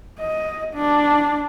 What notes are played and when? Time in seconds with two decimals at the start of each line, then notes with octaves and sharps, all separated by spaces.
0.20 D#5
0.75 D4